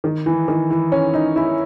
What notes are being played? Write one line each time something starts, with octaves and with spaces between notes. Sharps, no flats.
D#3
E3
D#3
E3
C#4
D#4
E4